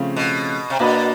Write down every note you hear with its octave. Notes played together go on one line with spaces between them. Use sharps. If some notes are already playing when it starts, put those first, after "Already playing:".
Already playing: C#3 F3 A3 C4
B2
C3
B2 A#3 D4 F#4 B4 D#5